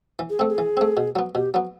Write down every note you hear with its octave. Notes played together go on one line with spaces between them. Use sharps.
E3
G#4
A3 C4 A4
G#4
E3
A3 C4
B2
F#3 B3
B2 G4
F#3 B3